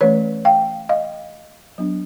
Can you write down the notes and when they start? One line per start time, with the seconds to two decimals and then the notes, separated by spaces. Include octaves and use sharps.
0.01 E3 A3 C#4 B4 C#5
0.45 F5 G5
0.89 D#5 F5
1.78 F#3 B3 D4